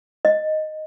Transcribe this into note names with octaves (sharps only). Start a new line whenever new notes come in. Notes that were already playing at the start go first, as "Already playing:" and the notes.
D#5